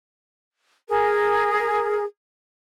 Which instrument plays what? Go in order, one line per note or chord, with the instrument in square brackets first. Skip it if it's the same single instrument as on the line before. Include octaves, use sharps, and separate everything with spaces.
[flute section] G#4 A#4